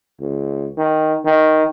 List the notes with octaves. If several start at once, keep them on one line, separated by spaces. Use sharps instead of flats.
C#2
D#3
D#3